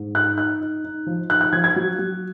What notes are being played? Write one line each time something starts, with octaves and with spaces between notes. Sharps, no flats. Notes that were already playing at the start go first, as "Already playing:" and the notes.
Already playing: G#2
D#4 F#6
D#4 F#6
D#4
D#4
F3
D#4 F#6
F#6
F3 G#6
G#6
F#3
F#3